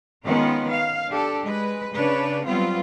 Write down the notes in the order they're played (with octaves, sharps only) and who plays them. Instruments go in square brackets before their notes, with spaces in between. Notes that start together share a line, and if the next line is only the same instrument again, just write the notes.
[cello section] D#3 G#3 B3 C#4 F4
F5
D4 G4 A4
G#3 B4
C#3 D4 B4 C#5
F#3 G3 B3 C4 F4